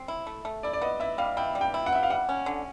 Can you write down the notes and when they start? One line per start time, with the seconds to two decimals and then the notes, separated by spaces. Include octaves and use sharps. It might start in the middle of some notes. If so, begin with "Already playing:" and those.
Already playing: C4
0.08 E4
0.27 A3
0.45 A3
0.63 E4 D5
0.73 D5
0.81 B3 D#5
1.00 E4 E5
1.18 G3 F5
1.37 E4 G5
1.55 G3
1.61 G5
1.74 E4
1.86 F#5
1.92 E4 E5
2.03 F5
2.10 G3 F#5
2.29 C#4
2.46 D3